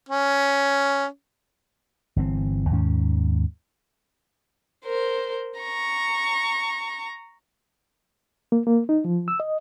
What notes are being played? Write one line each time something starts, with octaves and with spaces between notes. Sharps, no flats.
C#4
G1 E3 C4
D#2 G#2 D#3 C#4
A#4 C5
A#5 C#6
A#3
A#3
D#4
F3
E6
D#5